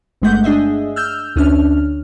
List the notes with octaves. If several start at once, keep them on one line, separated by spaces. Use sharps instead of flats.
G1 G2 G#3 A3 F#5 G6
D4 G#4 D#5 E5
E6 F6 G6
D2 C#4 D4 F6